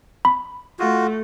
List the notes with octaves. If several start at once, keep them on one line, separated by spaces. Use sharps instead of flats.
B5
A3 F4 F#4